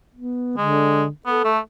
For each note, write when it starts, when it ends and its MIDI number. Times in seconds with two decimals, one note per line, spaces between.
0.15 0.57 59
0.57 1.08 50
0.57 1.03 56
1.26 1.42 59
1.26 1.52 69
1.45 1.59 57